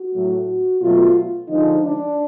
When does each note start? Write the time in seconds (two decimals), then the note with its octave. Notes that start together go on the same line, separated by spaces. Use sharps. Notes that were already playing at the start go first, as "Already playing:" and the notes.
Already playing: F#4
0.14 A2 F#3 A3
0.82 B2 F#3 A3 F4
1.49 D3 F3 G#3 D#4
1.84 D4